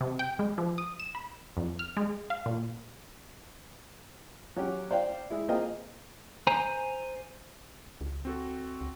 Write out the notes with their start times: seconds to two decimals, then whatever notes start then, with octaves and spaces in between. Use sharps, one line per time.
0.01 C3
0.19 G5
0.39 G#3
0.58 F3
0.78 D#6
1.00 E7
1.15 B5
1.57 F2
1.79 F6
1.97 G#3
2.30 F5
2.46 A#2
4.56 F#3 C#4 G4
4.91 C5 D5 F5 G5
5.30 G#3 E4
5.48 A#3 C4 F4 G#4 D#5 G5
6.47 C5 G#5 A#5
8.01 C#2
8.25 C4 F#4 A4
8.81 C#2